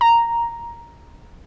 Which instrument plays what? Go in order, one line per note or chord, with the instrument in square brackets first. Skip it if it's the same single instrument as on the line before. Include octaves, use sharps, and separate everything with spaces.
[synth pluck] A#5